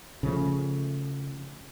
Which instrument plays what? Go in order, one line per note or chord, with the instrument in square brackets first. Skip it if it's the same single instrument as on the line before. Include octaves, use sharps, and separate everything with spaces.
[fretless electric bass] C#3 F3 A3